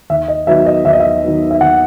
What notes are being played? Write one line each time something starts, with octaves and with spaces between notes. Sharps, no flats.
D#2 E5
D#5
D#3 F#3 B3 E5
D#5
D#2 E5
D#5
E5
D#3 F#3 B3
E5
D#2 F#5